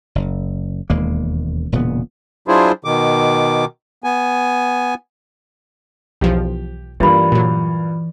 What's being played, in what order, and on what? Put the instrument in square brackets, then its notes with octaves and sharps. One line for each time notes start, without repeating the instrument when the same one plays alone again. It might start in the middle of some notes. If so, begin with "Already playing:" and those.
[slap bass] F#1
E1 D#2 G#3 A#3
E1 A#2 C#3 B3
[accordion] F#3 D4 E4 F4 G#4 C5
B2 D#3 D6
B3 G#5
[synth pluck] B1 E2 F3 [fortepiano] G4
[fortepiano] G2 G3 A#3 [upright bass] E3 [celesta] F4 B5
[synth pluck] A#2 F#3